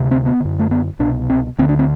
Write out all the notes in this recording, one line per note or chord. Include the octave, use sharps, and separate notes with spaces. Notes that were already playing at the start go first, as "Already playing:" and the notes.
Already playing: D2 C3
C4
B3
F#2 D3
A3
B3
C2 B2 D4
C4
D2 D3 C4
D4
C4